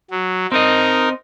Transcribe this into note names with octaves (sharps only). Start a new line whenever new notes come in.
F#3
C4 D#4 A#4 D#5